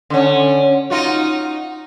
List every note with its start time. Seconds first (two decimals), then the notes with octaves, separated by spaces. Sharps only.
0.10 D3 C#4
0.90 D#4 F4 F#4